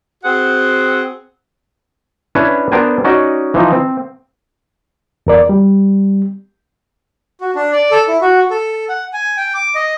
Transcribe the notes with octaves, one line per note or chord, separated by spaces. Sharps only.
C4 F#4 G#4 C5 F#5
C#4 D4 E4 B4 C#5
B3 D4 A#4 C5 G5 G#5
C#4 D#4 F#4 D5 D#5
E3 F3 D#4
C4
E2 A#4 D5
G3
F#4
D4
D5
A4
E4
F#4
A4
F#5
G#5
G5
D6
D#5